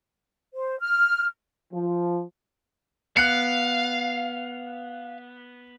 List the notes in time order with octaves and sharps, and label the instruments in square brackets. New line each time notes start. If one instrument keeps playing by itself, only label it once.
[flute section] C5
F6
[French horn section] F3
[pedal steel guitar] B3 [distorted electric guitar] F5 [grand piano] F#6 C#7